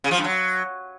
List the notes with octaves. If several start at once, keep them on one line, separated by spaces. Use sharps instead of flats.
C#3
F3
G2
F#3